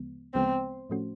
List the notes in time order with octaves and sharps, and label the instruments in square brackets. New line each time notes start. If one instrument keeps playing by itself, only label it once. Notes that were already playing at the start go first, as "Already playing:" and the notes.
Already playing: [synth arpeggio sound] D2 C#3 F3 G#3 B3
[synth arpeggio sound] D2 C#3 F3 G#3 B3 [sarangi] C4
[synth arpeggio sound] A2 F3 A3 C#4 F#4